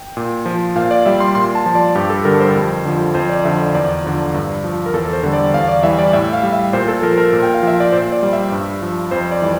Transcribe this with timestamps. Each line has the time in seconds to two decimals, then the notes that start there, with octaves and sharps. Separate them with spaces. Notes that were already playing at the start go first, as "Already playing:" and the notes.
Already playing: G5
0.17 A#2
0.46 F3
0.76 A#2 F5
0.91 D5
1.06 G3 E5
1.20 C6
1.35 A#2 C6
1.55 A5
1.66 F3
1.75 D5
1.95 G2 G4
2.10 A4
2.25 D3 G3 A#4
2.40 C5
2.55 F2
2.85 D3 F3
3.15 F2 C5
3.29 D5
3.44 D3 F3 E5
3.60 D5
3.75 E2 D5
4.04 D3 F3
4.34 G2
4.64 F3
4.86 A#4
4.94 E2 A4
5.13 C5
5.23 D3 G3
5.33 D5
5.54 E2 F5
5.68 D5
5.83 E3 G3 E5
5.99 D5
6.13 A2 E5
6.33 F5
6.43 G3
6.53 E5
6.73 A#2 C5
6.88 A4
7.02 F3 A#4
7.18 A#4
7.33 A#2
7.43 G5
7.54 F5
7.63 F3 E5
7.80 D5
7.92 A#2 C5
8.12 D5
8.23 G3
8.33 E5
8.52 G2
8.82 F3
9.11 F2 C5
9.32 D5
9.42 E3 G3 C5